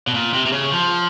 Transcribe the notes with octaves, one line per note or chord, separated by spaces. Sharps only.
B2
A#2
C3
C3
C#3
F3